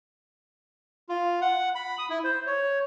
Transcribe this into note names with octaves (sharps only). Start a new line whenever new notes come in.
F4
F#5
B5
D#6
E4
C5
C#5